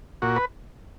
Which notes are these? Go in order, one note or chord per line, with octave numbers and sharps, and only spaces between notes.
A#2 F#4
B4